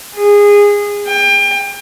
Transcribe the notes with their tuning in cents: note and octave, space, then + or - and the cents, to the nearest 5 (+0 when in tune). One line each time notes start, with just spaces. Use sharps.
G#4 -20
G5 +30